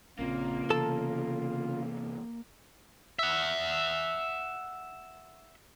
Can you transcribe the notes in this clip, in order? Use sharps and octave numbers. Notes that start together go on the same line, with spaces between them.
A#1 C#3 A#3 C4 F4
C3 E3 B3 A4 A5
E5 F#5